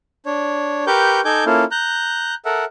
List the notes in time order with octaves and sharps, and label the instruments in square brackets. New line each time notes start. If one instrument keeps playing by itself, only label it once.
[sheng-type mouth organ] D4 C#5
G4 A#4 B4 C#6 D6 G6
D#4 A4 G#5 D6 G6
A#3 C#4 E4 F4 A4
A#5 F#6 G6
A4 A#4 E5 F#5